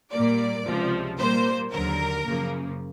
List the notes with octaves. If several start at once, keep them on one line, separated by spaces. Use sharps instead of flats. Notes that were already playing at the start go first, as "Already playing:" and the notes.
A#2 G3 A#3 D5
C#2 C3 F3
A#2 G3 A#3 C5
D#2 D3 F#3 A#4
F#2 C#3 F3 A#3